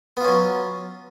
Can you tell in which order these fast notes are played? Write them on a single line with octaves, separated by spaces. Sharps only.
B3 F4 C#4 F#3